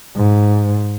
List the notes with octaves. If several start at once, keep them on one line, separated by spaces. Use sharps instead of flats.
G#2